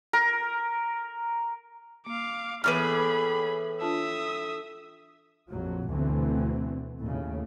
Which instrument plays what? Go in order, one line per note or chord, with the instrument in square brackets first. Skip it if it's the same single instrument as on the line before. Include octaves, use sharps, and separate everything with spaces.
[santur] A#4
[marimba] A#3 [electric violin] F5 D6
[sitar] A2 [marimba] E3 B3 [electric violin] G#4 B5 [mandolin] B4 D6 F6
[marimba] D4 F4 A5 [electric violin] E5 D#6
[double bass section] A#1 F2 F#3
D2 B2 D3 E3 C4
D#2 A2 C#3